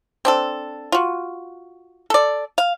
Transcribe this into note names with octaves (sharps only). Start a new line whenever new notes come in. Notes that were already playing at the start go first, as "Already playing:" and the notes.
C4 D4 A4
F4 F#4
A4 D5
F5